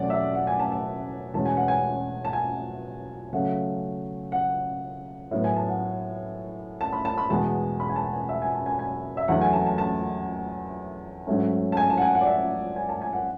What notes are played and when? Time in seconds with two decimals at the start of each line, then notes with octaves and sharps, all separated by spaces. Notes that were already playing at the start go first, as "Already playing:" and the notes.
Already playing: E2 B2 F#3 A3 C#4 D5 F#5
0.10 E5
0.35 F#5
0.47 G#5
0.60 A5
0.72 A5
1.34 E2 B2 G#3 C#4 A5
1.45 G#5
1.57 F#5
1.68 G#5
2.25 A5
2.33 G#5
3.33 C#3 F#3 A3 C#4 F#5
4.32 F#5
5.31 A2 F#3 B3
5.44 G#5
5.56 A5
5.69 F#5
6.81 A5
6.93 B5
7.05 A5
7.18 B5
7.30 E2 B2 G#3 B3 A5
7.80 B5
7.90 G#5
7.96 A5
8.13 G#5
8.29 E5
8.42 G#5
8.55 A5
8.66 G#5
8.79 G#5
9.17 E5
9.28 E2 D3 F#3 A3 F#5
9.41 G#5
9.53 A5
9.66 A5
9.78 A5
11.27 G#2 F#3 A3 C#4
11.72 A5
11.77 G#5
11.90 A5
11.98 F#5
12.02 G#5
12.15 F#5
12.21 D5
12.27 E5
12.76 G#5
12.89 A5
13.02 G#5
13.13 F#5